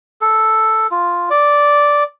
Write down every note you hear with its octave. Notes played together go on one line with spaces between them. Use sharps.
A4
F4
D5